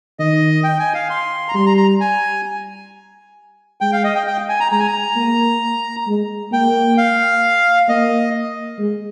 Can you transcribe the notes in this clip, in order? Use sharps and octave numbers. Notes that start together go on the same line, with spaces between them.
D#3 D#5
G5
G#5
F5
C6
A#5
G3 C6
A#5
A#5
G#5
G#3 G5
F5
D#5
G5
G5
G#5
A#5
G#3 A#5
G#5
A#5
A#3
G#3
A#3 G5
F5
A#3 D#5
G#3